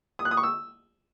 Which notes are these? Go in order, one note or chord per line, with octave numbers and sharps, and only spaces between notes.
D#6
F#6
D#6
C#6
E6